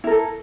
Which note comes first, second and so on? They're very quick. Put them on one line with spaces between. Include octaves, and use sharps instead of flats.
E4 A#4 A4